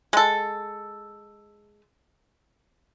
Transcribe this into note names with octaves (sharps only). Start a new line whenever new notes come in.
G#3 A4